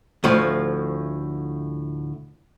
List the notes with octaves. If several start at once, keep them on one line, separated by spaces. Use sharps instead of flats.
D2 A2 F3